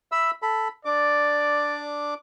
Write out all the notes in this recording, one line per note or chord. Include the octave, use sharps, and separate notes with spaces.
E5 B5 E6
A4 B5
D4 D5 D6